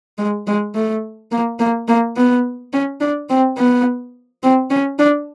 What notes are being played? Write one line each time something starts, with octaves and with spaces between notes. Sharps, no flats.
G#3
G#3
A3
A#3
A#3
A#3
B3
C#4
D4
C4
B3
C4
C#4
D4